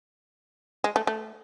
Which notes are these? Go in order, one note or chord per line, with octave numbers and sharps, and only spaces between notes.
G#3
A3
A3